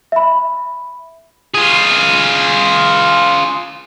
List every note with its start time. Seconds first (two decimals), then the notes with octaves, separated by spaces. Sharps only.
0.12 E5 B5
1.55 F4 G#4